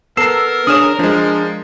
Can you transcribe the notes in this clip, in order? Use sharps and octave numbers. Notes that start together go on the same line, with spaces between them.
B3 A4 A#4 E6 C7 E7
D4 G#4 C#5 D#6 F6 E7
F3 G#3 D4